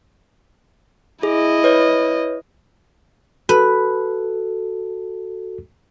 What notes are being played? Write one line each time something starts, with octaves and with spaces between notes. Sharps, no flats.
E4 G#4 D#5
B4 C#5
F#4 A4 B4